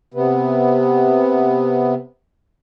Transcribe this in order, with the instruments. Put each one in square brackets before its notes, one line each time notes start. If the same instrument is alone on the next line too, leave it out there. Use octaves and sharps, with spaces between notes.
[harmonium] C3 B3